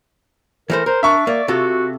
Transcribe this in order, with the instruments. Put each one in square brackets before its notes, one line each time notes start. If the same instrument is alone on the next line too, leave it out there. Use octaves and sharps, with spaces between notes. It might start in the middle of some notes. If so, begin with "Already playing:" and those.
[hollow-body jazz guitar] E3 A3 C5 [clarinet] A#4
[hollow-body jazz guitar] A#4 [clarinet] C5
[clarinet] D4 [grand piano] E5 C#6
[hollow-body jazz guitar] A#3 [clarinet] D5
[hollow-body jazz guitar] C3 F4 A4 [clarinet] F#4